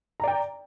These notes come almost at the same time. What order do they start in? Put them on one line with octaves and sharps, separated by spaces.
A#5 D5 G5